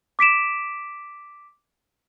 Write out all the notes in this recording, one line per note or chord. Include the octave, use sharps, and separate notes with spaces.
D6 B6 D7 E7